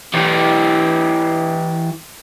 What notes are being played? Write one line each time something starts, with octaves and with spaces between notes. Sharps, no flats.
E3 G4